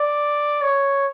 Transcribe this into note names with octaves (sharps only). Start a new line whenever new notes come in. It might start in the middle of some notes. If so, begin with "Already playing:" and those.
Already playing: D5
C#5